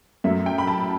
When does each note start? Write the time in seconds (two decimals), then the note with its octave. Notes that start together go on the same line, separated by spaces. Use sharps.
0.24 F#2 F#3 A3 E5
0.46 G5
0.58 B5
0.67 A5